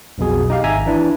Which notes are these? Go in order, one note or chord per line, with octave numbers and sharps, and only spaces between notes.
B1 F2 B2 G#4
D#4 G4 F5
G#1 E5 G#5 A#5
E3 D4 E4